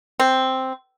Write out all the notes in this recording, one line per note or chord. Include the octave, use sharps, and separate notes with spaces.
C4